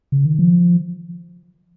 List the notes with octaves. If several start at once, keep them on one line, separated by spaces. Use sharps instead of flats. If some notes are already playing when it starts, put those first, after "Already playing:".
C#3
D#3
F3